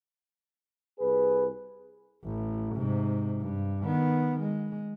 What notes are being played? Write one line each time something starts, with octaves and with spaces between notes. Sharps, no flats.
C2 G#4 B4
A1
G#2 C3
G2
D#3 B3
G#3